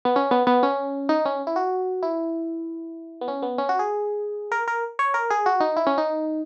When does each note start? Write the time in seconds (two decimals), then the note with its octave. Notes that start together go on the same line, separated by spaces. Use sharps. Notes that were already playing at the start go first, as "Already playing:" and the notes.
0.05 B3
0.16 C#4
0.31 B3
0.47 B3
0.63 C#4
1.09 D#4
1.25 C#4
1.47 E4
1.56 F#4
2.03 E4
3.21 B3
3.28 C#4
3.42 B3
3.58 C#4
3.69 F#4
3.79 G#4
4.52 A#4
4.68 A#4
4.99 C#5
5.14 A#4
5.30 G#4
5.46 F#4
5.60 D#4
5.77 E4
5.87 C#4
5.98 D#4